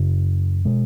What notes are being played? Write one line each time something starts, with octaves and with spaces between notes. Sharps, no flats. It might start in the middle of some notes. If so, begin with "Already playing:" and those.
Already playing: F#2 C#3
B2 G#3